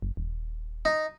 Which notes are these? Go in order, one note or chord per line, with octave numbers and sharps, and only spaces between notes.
F#1
D#1
D#4